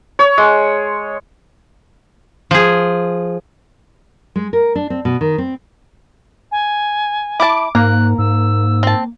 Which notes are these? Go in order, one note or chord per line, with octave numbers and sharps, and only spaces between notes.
C#5
G#3
F3 G#4
G#3
A#4
D4
C4
B2
D#3
C4
G#5
E4 A5 D6
G#2 A#3 A#4 F#6
G#2 E6
C4 A5